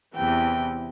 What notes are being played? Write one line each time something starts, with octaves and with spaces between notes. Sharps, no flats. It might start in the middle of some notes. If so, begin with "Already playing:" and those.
E2 C3 E3 G5